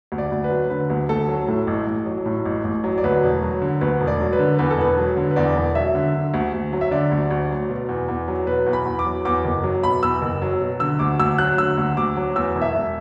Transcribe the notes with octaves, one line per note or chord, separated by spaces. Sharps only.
D2
D5
D2
B4
F#3
D3 B4
D2
D2 A4
F#3
A2 A4
A1
A1
F#3
A2
A1
A1
F#3
D5
D2 B4
E1
F#3
D3
D2 B4
E1
D5
F#3
B4
D3
E2 B4
A4
E1 B4
F#3
D3
B4
E2 D5
E1
F#3 E5
D3
D3
D2
D2
F#3
E5
D3 D5
D2
D2
F#3
B2
E2
E2
F#3
B2 B4
E2
B5
E2
D6
F#3
E2 D6
F#1
F#3
B2 B5
E2 E6
F#1
F#3
B2
D3 E6
D2 D6
D2 E6
F#3 F#6
D3 E6
D2
D2 D6
F#3
E2 E6
E1
E5
E1